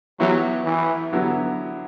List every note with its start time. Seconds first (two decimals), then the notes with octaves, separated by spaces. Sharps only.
0.20 E3 F#3 B3 E4 G4
0.65 E3
1.12 D3 F#3 B3 E4 G4